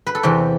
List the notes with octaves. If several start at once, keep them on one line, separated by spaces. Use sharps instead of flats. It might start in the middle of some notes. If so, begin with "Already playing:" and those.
B4
A4
E2 C3 E3 G4